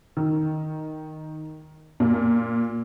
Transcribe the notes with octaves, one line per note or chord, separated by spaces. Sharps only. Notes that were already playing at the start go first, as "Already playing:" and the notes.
D#3
A#2